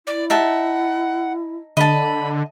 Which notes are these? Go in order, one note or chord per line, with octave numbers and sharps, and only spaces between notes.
E4 D5
D#4 E5 F#5 A5
D3 D#5 A5 B5